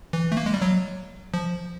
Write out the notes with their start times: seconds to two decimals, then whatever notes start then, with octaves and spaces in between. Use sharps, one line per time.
0.13 E3
0.32 A3
0.37 A#3
0.46 G#3
0.54 G3
0.62 F#3
1.34 F3